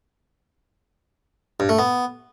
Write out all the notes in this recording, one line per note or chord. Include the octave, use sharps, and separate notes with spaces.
G2
A3
B3